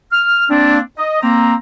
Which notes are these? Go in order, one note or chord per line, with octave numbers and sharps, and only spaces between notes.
F6
A#3 C4 D4
D#5
A#3 C4 A#5